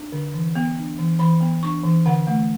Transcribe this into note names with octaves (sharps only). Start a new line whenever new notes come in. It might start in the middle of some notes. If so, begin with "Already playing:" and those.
Already playing: D4
D3
E3
B3
D4
E3
E3 B5
B3
D4 C#6
E3
D3 F#5
A3